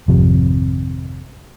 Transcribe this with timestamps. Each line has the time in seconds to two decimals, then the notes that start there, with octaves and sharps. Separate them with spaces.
0.08 G#1 F2 C3